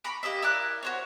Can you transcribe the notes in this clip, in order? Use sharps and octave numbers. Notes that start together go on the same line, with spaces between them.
A#5 B5 C#6 D6
A#3 G4 D#5 E5
E4 A#4 D5 F#6
F#4 C5 C#5